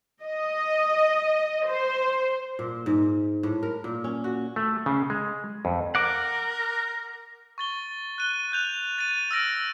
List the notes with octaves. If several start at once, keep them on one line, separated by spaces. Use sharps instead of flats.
D#5
C5
A#2
G#2
A2
A#4
A#2
C#4
F#4
A3
C#3
G#3
F2
A#4 F#5 D6
C#6 A6 G7
F#6 D#7 G7
F#6 G6 F7
A6 D#7
E6 F6 A#6 D7